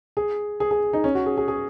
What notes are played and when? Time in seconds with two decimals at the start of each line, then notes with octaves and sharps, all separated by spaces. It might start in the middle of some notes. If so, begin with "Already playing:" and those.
0.17 G#4
0.60 G#4
0.71 G#4
0.93 D#4
1.04 C#4
1.15 F#4
1.26 G#4
1.38 G#4
1.48 G#4